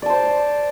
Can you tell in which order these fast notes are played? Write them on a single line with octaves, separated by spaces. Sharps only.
D5 A5 C5